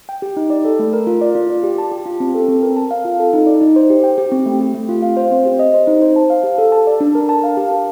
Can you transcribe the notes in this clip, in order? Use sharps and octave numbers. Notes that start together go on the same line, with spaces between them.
G5
G4
D#4
D5
A4
A3
A#4
F4
D5
F4
D5
G4
A5
G4
F4
C4
A4
C4
A#4
A5
F5
F4
A4
D#4
D5
D#4
C5
G4
G5
G4
C4
A3
G4
A3
F4
F5
C5
C4
G4
D#5
C5
D#4
C5
A5
F5
G4
A4
A5
D5
D4
A#4
A5
F5
G4
A#4